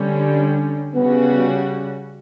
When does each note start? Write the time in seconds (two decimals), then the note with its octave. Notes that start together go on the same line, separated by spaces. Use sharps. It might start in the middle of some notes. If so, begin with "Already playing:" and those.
Already playing: D3 G3 C#4
0.95 C#3 G3 B3 C#4 F#4